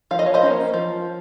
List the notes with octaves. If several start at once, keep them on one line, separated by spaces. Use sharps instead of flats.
F3 F5
D#5
C#5
C5 D#5
A#3 C#4
F3